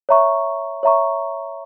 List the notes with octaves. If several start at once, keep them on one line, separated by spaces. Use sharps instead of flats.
C#5 E5 A#5 C#6
C#5 E5 A#5 C#6